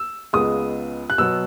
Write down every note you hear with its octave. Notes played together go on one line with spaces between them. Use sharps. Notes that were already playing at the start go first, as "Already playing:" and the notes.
Already playing: E6
C#2 C#3 G#3 B3 D#6
F#6
B2 F#3 B3 E6